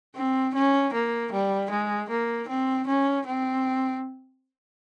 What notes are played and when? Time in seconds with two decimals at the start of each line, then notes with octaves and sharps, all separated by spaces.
0.15 C4
0.54 C#4
0.93 A#3
1.32 G3
1.71 G#3
2.09 A#3
2.48 C4
2.87 C#4
3.26 C4